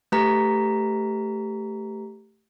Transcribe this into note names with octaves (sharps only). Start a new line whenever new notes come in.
A3 G4 B4 A#5 B6